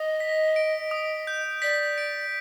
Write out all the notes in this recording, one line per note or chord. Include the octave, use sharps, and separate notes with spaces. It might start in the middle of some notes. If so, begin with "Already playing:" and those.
Already playing: D#5 D#6
B6
D7
D#6
G6
D5 B6
D7